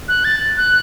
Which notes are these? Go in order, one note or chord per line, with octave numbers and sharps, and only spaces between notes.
F#6
A6
F#6